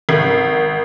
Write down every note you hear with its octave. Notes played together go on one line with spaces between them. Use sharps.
G#1